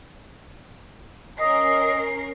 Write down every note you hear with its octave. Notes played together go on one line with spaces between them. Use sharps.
C#4 A#4 D#5 C7